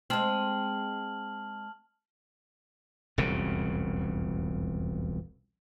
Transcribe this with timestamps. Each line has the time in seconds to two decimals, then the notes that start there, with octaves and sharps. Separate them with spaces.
0.10 G#3 C4 A5 F6 F#7
3.18 E1 C2 F2 C#3